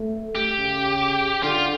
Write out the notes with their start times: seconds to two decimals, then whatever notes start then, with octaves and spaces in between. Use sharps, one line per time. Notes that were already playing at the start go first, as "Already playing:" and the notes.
Already playing: A3
0.35 G4
0.56 C#3
1.43 D3 F4